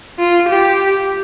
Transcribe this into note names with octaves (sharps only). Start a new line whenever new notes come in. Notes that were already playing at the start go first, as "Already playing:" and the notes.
F4
G4